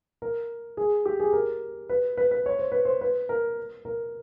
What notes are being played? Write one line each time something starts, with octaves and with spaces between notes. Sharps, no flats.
A#4
G#4
G4
G#4
A#4
B4
B4
B4
C#5
C5
B4
C5
B4
A#4
A#4